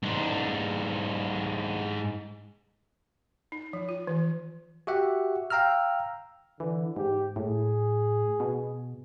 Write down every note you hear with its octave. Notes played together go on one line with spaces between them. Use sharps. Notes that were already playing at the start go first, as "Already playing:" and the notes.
G#2 D4
D#4
F3
F4
E3
F#4 G4 E5 F#5
F5 G5 A#5 E6 F6
D3 E3
G#2 G4
A2 G#4
B2